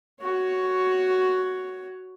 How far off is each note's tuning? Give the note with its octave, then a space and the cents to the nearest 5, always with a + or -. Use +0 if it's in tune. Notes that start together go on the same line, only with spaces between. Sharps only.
F#4 +5 C#5 +5